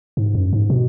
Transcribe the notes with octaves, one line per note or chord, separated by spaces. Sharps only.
G#2
F#2
G#2
B2